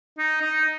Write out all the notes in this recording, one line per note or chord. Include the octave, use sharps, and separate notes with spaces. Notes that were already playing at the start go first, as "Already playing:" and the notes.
D#4
D#4